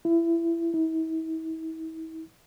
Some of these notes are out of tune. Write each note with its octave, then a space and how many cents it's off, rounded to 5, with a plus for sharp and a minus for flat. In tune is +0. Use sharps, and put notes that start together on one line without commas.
E4 +25
E4 -40